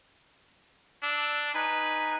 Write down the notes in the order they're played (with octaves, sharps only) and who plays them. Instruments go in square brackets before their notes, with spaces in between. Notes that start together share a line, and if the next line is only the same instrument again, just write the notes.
[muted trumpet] D4 [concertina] E6
[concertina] D#4 G#5 [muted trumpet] B4